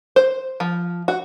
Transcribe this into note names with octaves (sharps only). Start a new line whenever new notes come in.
C5
F3
F#4